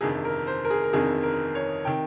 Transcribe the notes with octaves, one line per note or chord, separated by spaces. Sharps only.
G1 F2 C3 D#3 G#4
A#4
C5
A#4
G#4
A#4
G1 F2 C3 D#3 G#4
A#4
C#5
C3 D#3 G5